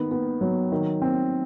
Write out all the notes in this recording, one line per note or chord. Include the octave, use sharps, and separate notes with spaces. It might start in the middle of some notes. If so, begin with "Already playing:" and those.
Already playing: D#3 B3
B3
F#3
D#3
C4